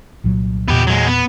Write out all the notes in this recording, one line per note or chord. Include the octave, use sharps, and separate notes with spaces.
C2 A#2 F#3
E2 A#2 B3 G4
F#3 G#3
B3